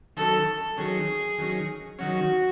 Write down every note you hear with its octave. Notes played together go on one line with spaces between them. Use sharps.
D#3 F#3 C#4 A4
D#3 F#3 C#4 G#4
D#3 F#3 C#4
D#3 F#3 C#4 F#4